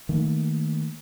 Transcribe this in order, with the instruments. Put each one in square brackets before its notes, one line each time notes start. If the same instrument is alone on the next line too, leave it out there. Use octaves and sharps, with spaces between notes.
[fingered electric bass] D#3 A3 A#3